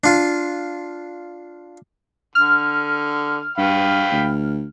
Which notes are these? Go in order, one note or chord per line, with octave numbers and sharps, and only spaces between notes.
D4 F4
D3 F6
G2 F5 G5 B5
D2